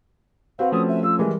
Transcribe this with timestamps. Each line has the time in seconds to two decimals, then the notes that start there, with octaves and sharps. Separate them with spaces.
0.59 C4 F#4 B4 F5
0.72 F3 A3 C#4 D#6
0.88 E5
1.03 F4 E6
1.19 E3 G3 G#3 A#4